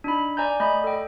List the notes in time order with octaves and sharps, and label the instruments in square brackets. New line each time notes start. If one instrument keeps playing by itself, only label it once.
[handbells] D4 D#4 B5
D5 G#5 A#5 G6
A3 D5 D#5 B5 G6
A4 G5